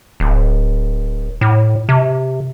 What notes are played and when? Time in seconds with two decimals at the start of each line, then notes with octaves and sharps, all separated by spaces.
0.20 D1
1.41 A2
1.89 C3